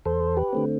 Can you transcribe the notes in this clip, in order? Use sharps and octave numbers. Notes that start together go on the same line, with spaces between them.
E2 A4 C5
G4 B4
D3 A3 C4